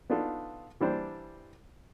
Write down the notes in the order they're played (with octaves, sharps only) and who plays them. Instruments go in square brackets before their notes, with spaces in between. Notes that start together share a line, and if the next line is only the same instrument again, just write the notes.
[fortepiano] B3 D4 D#4 F4 A4
E3 G3 D4 C5